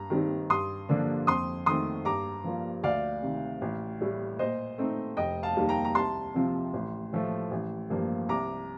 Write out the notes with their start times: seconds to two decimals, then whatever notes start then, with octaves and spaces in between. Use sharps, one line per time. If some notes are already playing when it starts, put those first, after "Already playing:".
Already playing: G2 A#5
0.10 D#3 G3 C4 D#4
0.50 G2 C6 D#6
0.89 D3 F3 A#3 D4
1.27 F2 C6 D#6
1.66 D#3 A3 C4 C6 D#6
2.05 G2 A#5 D6
2.44 F3 A#3 F4
2.83 D2 D5 F5
3.22 C3 D#3
3.61 A1
4.01 A2 G3
4.39 A#2 C5 D#5
4.78 A3 C4 D#4
5.17 F1 D#5 G5
5.43 F5 A5
5.56 D#2 D#3 G3 A#3
5.69 G5 A#5
5.85 A#5
5.95 C2 A5 C6
6.34 C3 F3 C4 F4
6.73 A1
7.13 A2 F3 A3
7.51 A1
7.90 G2 F3 A#3
8.29 C2 A#5 D6